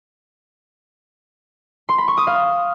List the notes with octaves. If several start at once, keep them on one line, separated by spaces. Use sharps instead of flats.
C6
B5
C#6
D#6
F5